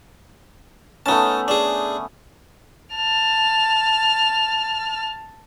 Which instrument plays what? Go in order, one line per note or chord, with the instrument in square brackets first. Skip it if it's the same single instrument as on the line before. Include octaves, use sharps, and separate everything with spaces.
[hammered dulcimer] A3 B3 C#4 [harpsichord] D#4 A5
[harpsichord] D4 G#4
[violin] A5 F6